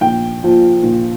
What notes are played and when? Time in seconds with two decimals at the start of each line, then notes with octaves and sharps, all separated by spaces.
0.01 A#1 G5
0.43 A#2 F3
0.83 A#1